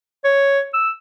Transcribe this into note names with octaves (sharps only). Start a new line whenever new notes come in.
C#5
E6